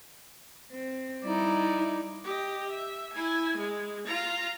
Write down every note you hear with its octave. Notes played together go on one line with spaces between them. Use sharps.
C4
G3 D#4 E4 D5
G4 D#5
E5
E4 G#5
G#3
F4 A#5